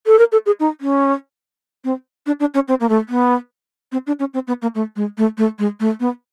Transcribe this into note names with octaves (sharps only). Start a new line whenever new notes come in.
A4
A#4
A4
G#4
D#4
C#4
C4
D4
D4
C#4
C4
A#3
A3
B3
C4
D4
C#4
C4
B3
A#3
A3
G#3
A3
A3
G#3
A3
B3